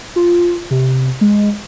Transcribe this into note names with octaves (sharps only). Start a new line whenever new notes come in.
F4
C3
G#3